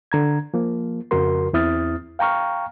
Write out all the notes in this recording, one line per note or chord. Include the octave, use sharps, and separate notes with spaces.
D3 A#5 G#6
F3 A#3
F2 C#3 F3 F#4 A#4 C6
E2 C4 E4 D#6 F6 A6
F5 G5 A#5 C#6 F6